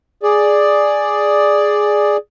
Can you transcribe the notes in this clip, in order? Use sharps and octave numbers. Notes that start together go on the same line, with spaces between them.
G#4 D5